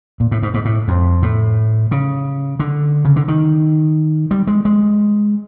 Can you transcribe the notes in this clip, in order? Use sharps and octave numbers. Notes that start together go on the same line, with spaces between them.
A#2
A2
G#2
G#2
A2
F2
A2
C#3
D3
C#3
D3
D#3
G3
G#3
G#3